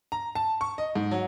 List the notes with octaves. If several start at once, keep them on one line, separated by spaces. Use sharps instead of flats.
A#5
A5
C#6
D#5
G#2
F#3